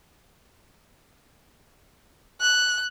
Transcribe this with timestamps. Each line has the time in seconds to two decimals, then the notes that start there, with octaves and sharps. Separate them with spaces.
2.41 F#6